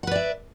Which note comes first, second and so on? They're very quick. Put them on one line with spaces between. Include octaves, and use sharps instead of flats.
F#5 B4 D5 E5